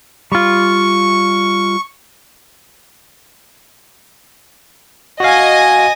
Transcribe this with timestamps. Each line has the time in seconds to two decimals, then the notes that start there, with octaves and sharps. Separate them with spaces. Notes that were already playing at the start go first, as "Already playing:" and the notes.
0.32 G3 F4 C#6
5.20 F#4 D#5 F5 G#5